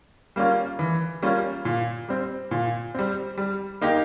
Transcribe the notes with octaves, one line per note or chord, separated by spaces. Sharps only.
G3 A#3 C#4 F4
E3
G3 A#3 C#4 F4
A#2
G3 C4
A#2
G3 C4
G3
A#3 D#4 G4